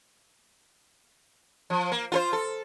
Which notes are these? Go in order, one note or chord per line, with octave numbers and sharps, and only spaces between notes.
F3
A#3
F4 A4 C5
A4